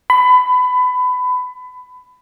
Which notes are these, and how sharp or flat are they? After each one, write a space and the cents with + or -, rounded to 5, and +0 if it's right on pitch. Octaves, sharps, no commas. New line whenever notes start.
B5 +25